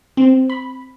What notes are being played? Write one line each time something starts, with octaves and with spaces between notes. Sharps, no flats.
C4
B5